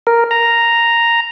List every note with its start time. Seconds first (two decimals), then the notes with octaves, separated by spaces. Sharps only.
0.07 A#4
0.31 A#5